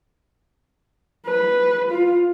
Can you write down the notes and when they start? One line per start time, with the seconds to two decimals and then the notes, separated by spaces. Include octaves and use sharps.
1.27 B4
1.91 F4